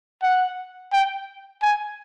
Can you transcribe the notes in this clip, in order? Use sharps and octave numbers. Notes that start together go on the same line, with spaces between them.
F#5
G5
G#5